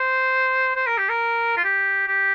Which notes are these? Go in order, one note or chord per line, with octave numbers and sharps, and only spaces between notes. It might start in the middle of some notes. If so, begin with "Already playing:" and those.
Already playing: C5
C5
A#4
G4
A#4
F4
G4
G4